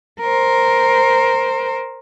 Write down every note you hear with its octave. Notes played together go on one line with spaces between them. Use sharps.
A#4 C5